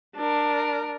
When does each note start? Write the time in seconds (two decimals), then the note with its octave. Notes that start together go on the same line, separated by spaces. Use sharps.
0.16 D4 A#4